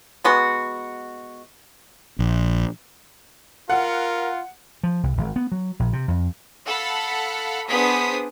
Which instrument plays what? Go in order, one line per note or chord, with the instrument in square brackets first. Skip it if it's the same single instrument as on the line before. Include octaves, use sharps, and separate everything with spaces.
[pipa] G#3 B3 F#4
[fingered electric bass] A#1
[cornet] F4 [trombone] A#4 [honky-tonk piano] F#5
[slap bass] F3
C2
G#1
B3
F#3
A#1
C3
F2
[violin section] A4 F5 F#5 B5
B3 D4 G#4 C5 D#6 B6